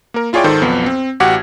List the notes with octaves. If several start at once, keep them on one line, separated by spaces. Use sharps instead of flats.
A#3 A#4
E4 F4 G#4 C#5 D5 G5
G#2 D#3 A4 C5
B1 F2 B3
C4
A1 F#4 G4 F#5 D6 G#6